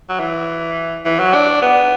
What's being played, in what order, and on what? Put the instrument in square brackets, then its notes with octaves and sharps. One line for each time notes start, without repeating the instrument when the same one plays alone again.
[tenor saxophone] F#3
E3
E3
F#3
D4
B3